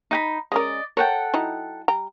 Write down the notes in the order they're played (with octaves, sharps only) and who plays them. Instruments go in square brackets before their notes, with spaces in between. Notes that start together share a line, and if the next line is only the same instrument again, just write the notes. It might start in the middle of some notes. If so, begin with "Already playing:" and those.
[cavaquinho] D#4 G5 B5
[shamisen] G#3 C#4 A#4 [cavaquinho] D5 D#5
[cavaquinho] A4 F#5 G5 [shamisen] A#4 C#5
[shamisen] F#3 D#4 E4
G3 G5 A#5